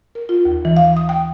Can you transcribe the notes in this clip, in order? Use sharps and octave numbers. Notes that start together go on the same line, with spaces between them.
A#4
F4
D#2
E3
F5
D#6
G5